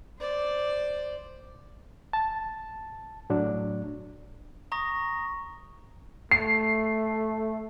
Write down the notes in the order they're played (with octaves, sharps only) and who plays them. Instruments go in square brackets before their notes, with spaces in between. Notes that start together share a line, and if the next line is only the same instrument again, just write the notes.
[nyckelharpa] C5 D5
[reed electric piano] A5
A2 F#3 D4
[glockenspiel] A#5 C#6 D#6 A#6
[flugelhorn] A3 [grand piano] C7